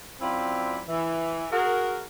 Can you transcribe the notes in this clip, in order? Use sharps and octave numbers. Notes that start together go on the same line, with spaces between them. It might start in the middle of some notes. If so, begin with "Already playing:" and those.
F#2 C4 E4 F4 D5 B5
E3
F#4 G#4 A#4